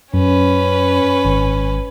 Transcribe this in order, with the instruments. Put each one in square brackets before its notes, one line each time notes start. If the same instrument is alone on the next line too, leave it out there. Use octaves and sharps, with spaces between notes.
[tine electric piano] F#2 [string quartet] C#4 B4
[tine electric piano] G#1